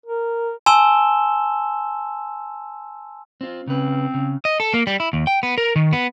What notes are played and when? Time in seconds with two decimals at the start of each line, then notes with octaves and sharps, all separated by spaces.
0.06 A#4
0.66 G#5 A5 C6 E6 E7 G7
3.41 C4 F4
3.68 C#3 C4 B4
4.14 C#3
4.45 D#5
4.60 A4
4.74 A#3
4.87 G3
5.00 E4
5.13 D#2
5.27 G5
5.43 B3
5.58 A#4
5.76 D#3
5.93 B3